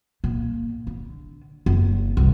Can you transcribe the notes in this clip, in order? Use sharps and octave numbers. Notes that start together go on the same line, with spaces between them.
A#2
D3
F#1
C2